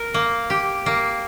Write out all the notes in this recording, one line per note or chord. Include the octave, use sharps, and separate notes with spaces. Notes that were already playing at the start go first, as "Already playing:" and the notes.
Already playing: A#4
A#3
G4
A#3